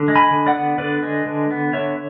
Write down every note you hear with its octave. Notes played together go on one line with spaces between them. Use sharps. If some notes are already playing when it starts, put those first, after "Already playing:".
Already playing: D3
G#3
G#5 B5
D3
D5 F#5
B3
D3 B4 D5
G#3
D3
B3
D3 C#5 E5